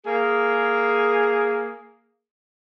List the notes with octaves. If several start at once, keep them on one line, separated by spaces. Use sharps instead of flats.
A#3 G#4